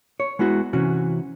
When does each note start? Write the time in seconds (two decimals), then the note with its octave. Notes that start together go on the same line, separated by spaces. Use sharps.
0.20 C#5
0.39 G#3 B3 E4 F#4
0.73 C3 E3 C#4 F#4